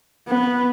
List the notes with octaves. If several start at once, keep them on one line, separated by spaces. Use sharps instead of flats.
B3